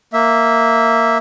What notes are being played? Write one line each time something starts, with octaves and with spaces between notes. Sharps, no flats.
A#3 E5